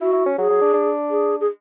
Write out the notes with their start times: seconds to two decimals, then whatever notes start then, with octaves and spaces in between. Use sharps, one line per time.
0.01 E4 F#4
0.13 E4
0.26 C#4
0.38 F#3 G#4
0.50 F#3
0.61 D4
0.74 D4
1.10 G#4
1.41 G#4